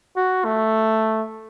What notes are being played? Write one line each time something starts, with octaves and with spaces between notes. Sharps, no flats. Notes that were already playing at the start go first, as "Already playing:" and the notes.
F#4
A3